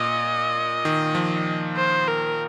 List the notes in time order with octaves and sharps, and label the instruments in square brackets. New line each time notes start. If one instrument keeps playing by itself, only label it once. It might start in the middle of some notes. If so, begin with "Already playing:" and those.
Already playing: [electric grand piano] A#2 [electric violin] D#5
[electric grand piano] D#3
F3
[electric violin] C5
A#4